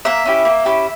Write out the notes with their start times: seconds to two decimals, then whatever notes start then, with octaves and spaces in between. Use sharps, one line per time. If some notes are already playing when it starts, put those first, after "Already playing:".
0.05 A#3 E5
0.25 C#4 E4 G4
0.45 A#3
0.65 C#4 E4 G4